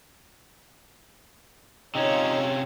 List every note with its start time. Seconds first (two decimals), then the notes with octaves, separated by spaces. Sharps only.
1.95 C3 C#4 D#4 F4 C#5